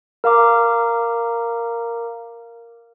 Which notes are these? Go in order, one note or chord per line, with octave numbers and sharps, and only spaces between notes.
A#4 F5 A#5 D6